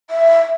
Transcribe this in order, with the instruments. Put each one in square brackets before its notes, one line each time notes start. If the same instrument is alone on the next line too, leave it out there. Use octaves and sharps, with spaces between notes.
[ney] E5